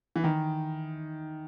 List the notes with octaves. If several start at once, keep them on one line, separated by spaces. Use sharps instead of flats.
E3
D#3